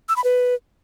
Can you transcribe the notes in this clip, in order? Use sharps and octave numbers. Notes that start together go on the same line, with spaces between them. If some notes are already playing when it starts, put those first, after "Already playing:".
E6
B5
B4